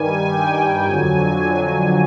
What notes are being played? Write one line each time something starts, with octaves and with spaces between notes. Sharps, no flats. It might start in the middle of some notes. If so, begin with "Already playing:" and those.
Already playing: G2 D#3 G3 G#5
G5
F2 D3 F#3 G#5